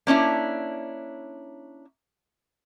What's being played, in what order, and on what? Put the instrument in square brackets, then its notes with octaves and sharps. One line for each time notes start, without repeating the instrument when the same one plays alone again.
[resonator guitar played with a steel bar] A#3 C#4 D4 E4